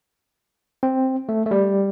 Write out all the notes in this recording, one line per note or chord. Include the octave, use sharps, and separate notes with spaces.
C4
A3
A3
G3